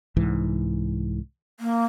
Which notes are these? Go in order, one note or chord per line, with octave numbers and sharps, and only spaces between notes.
C2 G#2 E3
A#3